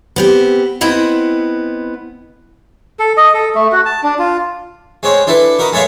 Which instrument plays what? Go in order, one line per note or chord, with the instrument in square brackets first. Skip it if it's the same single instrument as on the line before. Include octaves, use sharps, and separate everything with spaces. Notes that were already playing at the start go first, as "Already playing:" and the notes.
[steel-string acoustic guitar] B3 C4 G4
B3 C4 E4 D#5 F#5
[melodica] A4
D#5
A4
A3
F#4
A5
D4
F4
[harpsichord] G#3 C4 C#5
D4 E4 A4 B4
F#4 A#4 B4 D#5
G#3 A4 C#5 E5 F5